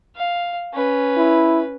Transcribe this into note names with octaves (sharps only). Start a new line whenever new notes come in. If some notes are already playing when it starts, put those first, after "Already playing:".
F5
C#4 B4
E4